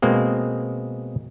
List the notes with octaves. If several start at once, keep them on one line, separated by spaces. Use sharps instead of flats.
B2 G#3 A#3 C4